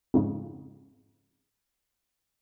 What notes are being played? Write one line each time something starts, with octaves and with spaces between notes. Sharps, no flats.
F2 G#2 C#3